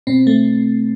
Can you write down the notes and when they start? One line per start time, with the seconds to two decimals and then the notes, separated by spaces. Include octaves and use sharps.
0.07 B2 C4
0.27 A3